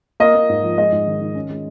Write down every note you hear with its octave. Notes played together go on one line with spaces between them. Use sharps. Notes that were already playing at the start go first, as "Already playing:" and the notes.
A#3 D#5
A#3
G#2
F3
G#3 D#5
G#2
D#3
D#3
C#4
G#3